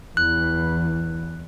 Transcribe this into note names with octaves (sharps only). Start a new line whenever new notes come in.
E2 E3 F#6